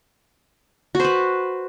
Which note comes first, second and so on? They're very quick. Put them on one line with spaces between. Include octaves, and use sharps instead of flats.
F#4 C5 B4